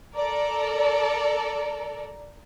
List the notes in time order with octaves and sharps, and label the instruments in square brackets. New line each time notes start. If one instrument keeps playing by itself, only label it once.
[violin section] A4 A#4 D5